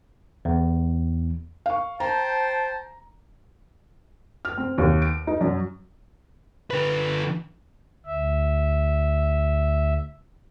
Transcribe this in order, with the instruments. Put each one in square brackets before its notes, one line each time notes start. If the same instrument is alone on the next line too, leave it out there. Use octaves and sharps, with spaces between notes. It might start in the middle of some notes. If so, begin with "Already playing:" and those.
[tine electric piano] E2
[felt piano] F5 C#6
[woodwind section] C5 G5 A5 [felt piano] A#5
[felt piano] F6
C4
D#2
D7
D#4
F#2
[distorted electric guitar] D3 B4
[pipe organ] D2 E5